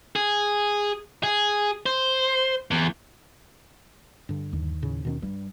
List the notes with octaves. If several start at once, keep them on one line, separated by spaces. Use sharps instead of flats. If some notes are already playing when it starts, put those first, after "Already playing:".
G#4
G#4
C5
E2
G2 D3
D#2
A2 C#3
B2 D#3 C#4
G2 G3